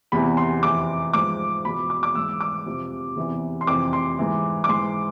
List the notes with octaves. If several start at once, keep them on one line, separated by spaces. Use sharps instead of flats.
E2 C3 E3 B5
C6
F2 E3 D6
G#2 F3 D6
E2 B2 B5
D6
D6
G#2 E3 E6
D6
F2 C3 F3
E2 C3 E3
C6
F2 C3 E3 D6
C6
G#2 E3
D6
G#2 E3 C6